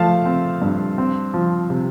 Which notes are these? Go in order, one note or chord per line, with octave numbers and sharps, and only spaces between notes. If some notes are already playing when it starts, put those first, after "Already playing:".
Already playing: F3 A3 F5 A5
C4
G2
C4
F3
C3